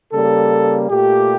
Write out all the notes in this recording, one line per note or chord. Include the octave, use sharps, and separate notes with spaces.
C#3 G3 A#3 A4
A#2 A3 G4